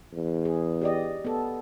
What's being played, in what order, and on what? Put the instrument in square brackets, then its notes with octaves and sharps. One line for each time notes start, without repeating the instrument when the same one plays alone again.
[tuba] E2
[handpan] G#4
G4 D5 D#5
B3 A4